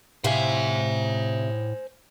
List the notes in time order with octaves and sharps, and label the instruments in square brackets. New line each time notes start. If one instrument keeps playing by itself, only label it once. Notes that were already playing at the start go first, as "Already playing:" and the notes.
[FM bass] A2 [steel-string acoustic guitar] C3 E5 F5 [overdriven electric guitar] C5 G#5